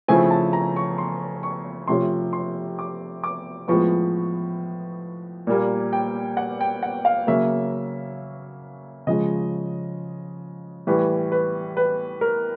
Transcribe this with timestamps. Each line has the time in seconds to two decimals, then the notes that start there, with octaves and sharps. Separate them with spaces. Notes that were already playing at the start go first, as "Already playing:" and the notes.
0.08 C#3 F3 A3 C4 E4 G#5
0.31 A5
0.53 A#5
0.76 C#6
0.98 C6
1.43 C#6
1.88 C3 F3 A3 C#4 C6
2.33 C6
2.79 D6
3.24 D6
3.68 A2 F3 G#3 B3 C#6
5.47 A#2 G3 A#3
5.93 G5
6.37 F#5
6.61 G5
6.83 F#5
7.05 F5
7.27 C#3 F#3 A#3 C#4 E5
9.07 C#3 F3 G#3 D#5
10.87 A2 E3 G3 B4
11.32 B4
11.77 B4
12.21 A#4